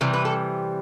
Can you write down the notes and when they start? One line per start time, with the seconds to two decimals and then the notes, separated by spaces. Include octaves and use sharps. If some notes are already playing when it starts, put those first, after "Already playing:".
0.01 C3 E3 G3
0.13 B4
0.25 A4